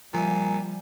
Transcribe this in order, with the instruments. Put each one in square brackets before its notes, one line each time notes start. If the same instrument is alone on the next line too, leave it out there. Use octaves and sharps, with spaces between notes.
[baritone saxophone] A#2 [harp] F3 C5 E5 [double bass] G3 [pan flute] G#5